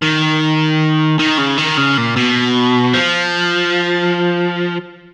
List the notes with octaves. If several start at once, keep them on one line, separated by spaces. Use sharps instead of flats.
D#3
D#3
C#3
D#3
C#3
A#2
B2
F3